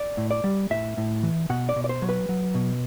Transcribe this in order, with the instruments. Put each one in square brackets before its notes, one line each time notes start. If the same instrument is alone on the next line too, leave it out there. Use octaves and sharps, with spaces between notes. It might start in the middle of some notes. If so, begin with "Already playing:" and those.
Already playing: [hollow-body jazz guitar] D5
A2
D5
G3
A2 E5
A2
E3
B2 F#5
D5
B2
D5
C5
F#3
B4
F#3
B2